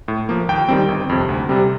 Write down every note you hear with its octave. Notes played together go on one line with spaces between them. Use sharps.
A2
F3 A#3
D#2 G5
D#3 G3 C4
G1
F2 C3
D2
C3 G3 C4